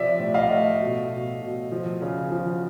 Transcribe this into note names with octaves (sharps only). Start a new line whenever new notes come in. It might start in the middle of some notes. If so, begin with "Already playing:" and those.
Already playing: C3 F3 D5 E5
A2
D#5 F5
A3
B2
B2
B2
F3
C#3
F3